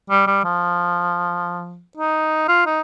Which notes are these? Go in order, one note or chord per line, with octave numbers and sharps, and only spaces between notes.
G3
G3
F3
D#4
F4
D#4